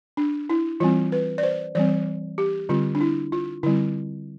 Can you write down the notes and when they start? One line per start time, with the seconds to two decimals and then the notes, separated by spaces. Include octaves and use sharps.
0.17 D4
0.50 E4
0.80 E3 G3 C4 F4
1.12 B4
1.38 D5
1.43 C5
1.75 E3 G3 C4 D5
2.38 G4
2.69 D3 G3 C4 F4
2.95 D4
3.01 E4
3.32 F4
3.63 D3 G3 C4 E4